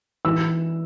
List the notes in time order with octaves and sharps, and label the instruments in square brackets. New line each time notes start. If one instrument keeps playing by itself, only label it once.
[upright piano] E3 E6